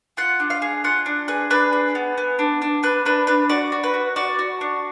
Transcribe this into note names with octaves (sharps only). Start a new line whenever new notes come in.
F4 F#5
D4
F5
G#4
F4 F#5
D4
G#4 B4
D4 B4
G#4
B3
B3
D4
D4
D4 B4
D4 B4
D4 B4
F#4 D5
F#4
B4
F#4
F#4 D5
F#4
D4